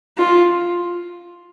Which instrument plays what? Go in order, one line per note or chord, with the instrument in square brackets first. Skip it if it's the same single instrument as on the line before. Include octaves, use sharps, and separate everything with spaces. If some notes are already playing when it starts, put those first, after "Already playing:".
[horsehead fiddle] F4